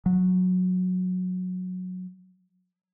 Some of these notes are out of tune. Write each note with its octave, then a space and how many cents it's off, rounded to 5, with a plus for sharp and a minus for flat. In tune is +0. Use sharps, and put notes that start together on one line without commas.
F#3 -15